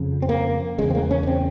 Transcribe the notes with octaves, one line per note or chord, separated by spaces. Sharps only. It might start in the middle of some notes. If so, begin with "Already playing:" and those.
Already playing: F2 C#3
C4
A#3
E2 C#3 G#3
C4
A#3
C#4
C#4
C4